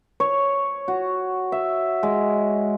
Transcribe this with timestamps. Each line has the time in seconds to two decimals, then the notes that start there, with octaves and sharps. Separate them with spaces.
0.20 C#5
0.88 F#4
1.52 E5
2.03 G#3